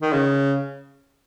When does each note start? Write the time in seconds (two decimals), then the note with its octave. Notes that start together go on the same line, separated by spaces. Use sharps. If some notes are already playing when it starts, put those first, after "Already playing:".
0.02 D#3
0.13 C#3